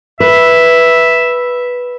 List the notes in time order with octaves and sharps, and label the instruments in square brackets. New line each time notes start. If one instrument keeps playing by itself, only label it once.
[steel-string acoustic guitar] B4 [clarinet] E5